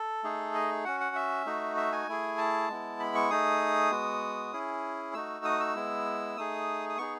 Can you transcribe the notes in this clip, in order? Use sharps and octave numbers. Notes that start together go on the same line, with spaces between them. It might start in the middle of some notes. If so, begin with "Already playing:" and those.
Already playing: A4
A3 D#4 G#4
D#5
C#4 F#4 F#5
F#5
E5
A3 D#4 F#4
E5
G#5
A3 E4 G#4
A5
G#3 B3 E4
B5
C#6
A3 D#4 G#4 D#6
G#3 B3 F#4
C#4 E4 G#4
A3 D#4 F#4 E6
D#6
E6
G#3 B3 E4
A3 D#4 G#4 D#6
D#6
B3 D#4 G#4 C#6